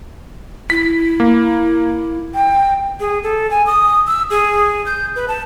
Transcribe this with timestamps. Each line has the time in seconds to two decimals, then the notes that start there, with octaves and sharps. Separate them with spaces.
0.70 E4 B6
1.20 A#3
2.35 G5
3.00 G#4
3.23 A4
3.51 G#5
3.66 D#6
4.07 E6
4.30 G#4
4.86 G6
5.16 B4
5.28 A5